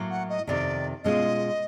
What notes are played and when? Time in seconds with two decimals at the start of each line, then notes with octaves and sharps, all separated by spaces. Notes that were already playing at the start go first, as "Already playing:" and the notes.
Already playing: A2 F#3 A#3
0.10 F#5
0.29 D#5
0.47 F2 C3 D#3 D5
1.04 B2 G#3 C#4 F4 D#5